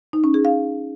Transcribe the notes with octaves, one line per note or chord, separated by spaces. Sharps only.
D#4
C#4
G#4
F5